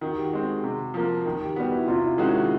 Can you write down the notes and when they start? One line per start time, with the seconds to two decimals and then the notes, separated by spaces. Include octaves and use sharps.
0.01 D#3 F#4
0.13 G4
0.25 F#4
0.33 G#3 C4
0.64 C3
0.94 F3 A#3
1.25 D#3
1.41 G4
1.56 G3 B3 F#4
1.71 E4
1.87 C3 F4
1.96 E4
2.06 D#4
2.15 D#3 G#3 C#4 E4 F#4